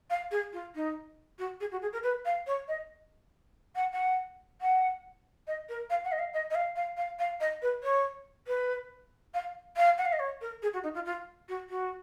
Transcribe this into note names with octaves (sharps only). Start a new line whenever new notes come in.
F5
G#4
F4
D#4
F#4
G#4
F#4
G#4
A#4
B4
F5
C#5
D#5
F#5
F#5
F#5
D#5
A#4
F5
F#5
D#5
F5
D#5
D#5
F5
F5
F5
F5
D#5
B4
C#5
B4
F5
F5
F#5
F5
D#5
C#5
A#4
G#4
F#4
D#4
F4
F4
F#4
F#4